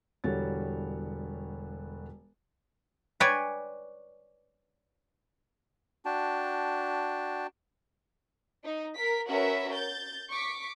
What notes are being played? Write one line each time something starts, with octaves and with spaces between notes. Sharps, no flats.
E1 D3 G3 F#4 C#5 A6
B4 C#5 D5 G5 G#5
D4 F#4 G5 A5
D#4
A#4 B6
C#4 F#4 A#4 B4 E5
G6 A6
C#6 D6 B6